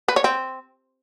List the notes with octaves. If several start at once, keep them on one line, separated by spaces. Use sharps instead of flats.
B4
C#5
C4